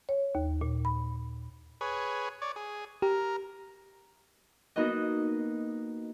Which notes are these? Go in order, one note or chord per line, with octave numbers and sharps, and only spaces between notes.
C#5
D#2
A#2
B5
G#4 B4 C#5
C#5 D5
G#4
G4 A#4
A#3 B3 D#4 F#4 D#5